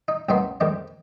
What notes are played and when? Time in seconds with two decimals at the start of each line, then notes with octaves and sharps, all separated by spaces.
0.08 D#4
0.29 C2 F#2 A#3 B3 D#4 C6
0.61 F2 D#3 G3 G#3 C4